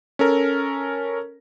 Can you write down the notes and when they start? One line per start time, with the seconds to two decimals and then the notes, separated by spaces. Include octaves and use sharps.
0.19 C#4 A4 A#4